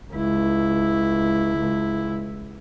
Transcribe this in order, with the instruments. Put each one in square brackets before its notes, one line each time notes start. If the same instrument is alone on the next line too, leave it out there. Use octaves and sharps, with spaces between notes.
[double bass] C#2 E4